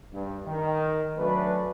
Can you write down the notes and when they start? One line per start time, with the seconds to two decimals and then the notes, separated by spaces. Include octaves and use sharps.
0.13 G2
0.46 D#3
1.17 F#3 A3 C#4 D4 B4